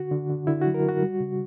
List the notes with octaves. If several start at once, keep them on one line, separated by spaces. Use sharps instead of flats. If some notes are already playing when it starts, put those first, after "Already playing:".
Already playing: D3 F#4
D3
D3
D3 E4
F#4
F#3
A#4
D3 F#4
G3
C#3